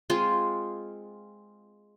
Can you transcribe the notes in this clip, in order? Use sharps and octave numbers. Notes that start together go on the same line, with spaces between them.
G#3 C4 F4 G#4